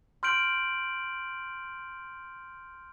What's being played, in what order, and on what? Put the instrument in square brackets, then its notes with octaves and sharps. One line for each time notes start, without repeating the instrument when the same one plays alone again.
[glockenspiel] C6 F6 G6 D7 F#7